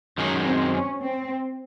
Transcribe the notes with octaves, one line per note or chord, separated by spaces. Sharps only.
F#2 D#3 G#3 C#4
C4
C#4
C4